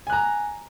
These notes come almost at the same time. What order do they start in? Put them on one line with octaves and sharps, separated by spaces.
G#5 F#6 A#5